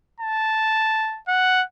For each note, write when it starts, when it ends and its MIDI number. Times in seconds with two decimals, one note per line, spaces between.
0.20 1.20 81
1.28 1.63 78